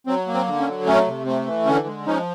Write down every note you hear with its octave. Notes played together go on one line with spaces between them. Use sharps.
F#3 C4
A#3
C4
D3
C#4
F#3
A3 C#4
C3
A3 C4
E3
D3 C#4
G#3
F3 C#4 D#4